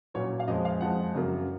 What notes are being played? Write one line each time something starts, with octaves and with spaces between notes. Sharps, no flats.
A#2 F#3 C#4 C#5
F5
F2 F3 G#3 D#5
F5
F2 F3 G#3 F#5
F#2 C#3 F#3 A#3